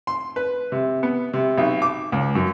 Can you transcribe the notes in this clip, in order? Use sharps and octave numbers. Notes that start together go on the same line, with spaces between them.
C6
B4
C3
B3
C3
B1
D6
C#2
F#2